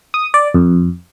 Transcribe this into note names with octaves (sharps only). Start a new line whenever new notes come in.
D#6
D5
F2